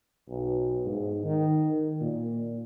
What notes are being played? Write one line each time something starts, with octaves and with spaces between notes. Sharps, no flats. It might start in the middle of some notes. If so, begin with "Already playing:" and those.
B1
G#2
D#3
A#2